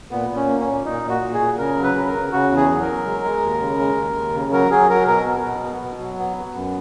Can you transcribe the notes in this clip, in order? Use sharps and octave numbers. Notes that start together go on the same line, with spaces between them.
A#2 B3
A#2
C#4
A#3
C#4
A#2
A#2 D#4
A#2
F#4
A#2
G#4
A#2
C#3 A#4
F#3
B4
C#3
A#4
C#3
C#3 F#4
E2
G#4
F#3
A#4
F#3
G#3
G#3
D#2
C#3
G#3
D#2
D#2
C#3
F#3 A#4
F#3 G#4
F#3 A#4
B2 A#4
B3
B2
B3
B2
F#3
B3
B3
F#2